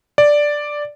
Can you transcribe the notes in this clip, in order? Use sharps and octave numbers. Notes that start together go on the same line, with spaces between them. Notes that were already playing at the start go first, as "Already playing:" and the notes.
D5